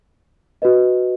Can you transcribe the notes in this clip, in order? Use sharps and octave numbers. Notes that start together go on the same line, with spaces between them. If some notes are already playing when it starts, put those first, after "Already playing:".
F#4 B4 D#5